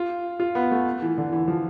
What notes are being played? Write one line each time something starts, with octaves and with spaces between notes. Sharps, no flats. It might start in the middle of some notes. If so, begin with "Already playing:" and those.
Already playing: F4
F4
B3
A3
E3
D3
E3
F3